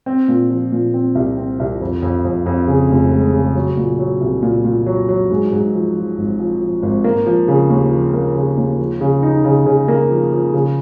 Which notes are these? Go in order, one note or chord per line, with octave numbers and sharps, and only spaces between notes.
C4
A#2
F3
A#2
C4
C2
C4
C2
F2
F2
F2
F2
C#3
F1
G#3
C#3
F#3
A#2
F#3
C2
A#2
A#2
F#3
F#3
G#2
G#2
F3
F3
G#1
F3
F3
G#1
A#3
F3
C#3
D#2
F3
A#3
C#3
D#2
F3
C#3
D#4
C#3
C#3
A#3
F3
F3
C#3